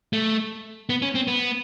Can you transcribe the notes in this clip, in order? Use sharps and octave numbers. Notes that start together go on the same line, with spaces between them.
A3
B3
C#4
C4
B3